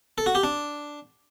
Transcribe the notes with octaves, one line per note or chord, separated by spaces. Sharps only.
A4
F#4
G4
D4